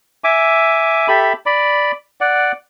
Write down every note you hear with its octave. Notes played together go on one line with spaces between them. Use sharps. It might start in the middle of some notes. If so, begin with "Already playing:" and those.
E5 G#5 D6
G4 A4 E5 B5
D5 B5
D5 F#5